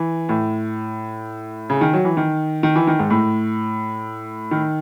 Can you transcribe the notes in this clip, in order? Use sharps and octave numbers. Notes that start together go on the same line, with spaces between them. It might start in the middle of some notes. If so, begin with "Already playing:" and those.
Already playing: E3
A2
C#3
D#3
F#3
E3
D#3
D#3
E3
D#3
G#2
A2
D#3